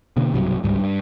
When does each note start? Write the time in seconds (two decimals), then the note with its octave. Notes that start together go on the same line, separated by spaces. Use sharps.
0.17 B2 D3 A#3
0.33 B1 G2 C3 F#3
0.63 G1 C#2 G#2 G3
0.79 G2